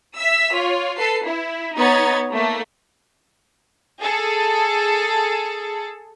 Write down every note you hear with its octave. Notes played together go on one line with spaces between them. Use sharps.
E5 E6 B6
F4 C#5
A4 B4 C7
E4
B3 D#4 C#5 G#6 A6
A3 A#3
G#4 A4